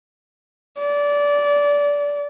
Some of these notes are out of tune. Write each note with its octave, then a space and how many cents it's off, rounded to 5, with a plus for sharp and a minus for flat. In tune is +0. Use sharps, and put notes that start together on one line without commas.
D5 -20